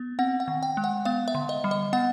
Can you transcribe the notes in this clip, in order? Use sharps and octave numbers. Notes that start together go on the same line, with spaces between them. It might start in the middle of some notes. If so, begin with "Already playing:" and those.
Already playing: B3
C4 F#5
F#5
D#3
G5
G#3
F#5
B3 F5
E5
D3
D#5
G3
D#5
B3 F#5